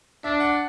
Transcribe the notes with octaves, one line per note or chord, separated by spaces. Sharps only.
D4 E5
F#5